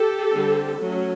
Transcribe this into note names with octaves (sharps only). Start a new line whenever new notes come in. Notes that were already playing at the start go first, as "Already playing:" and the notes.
Already playing: G4 A4
D3 G3 C4
F#3 A3 C#4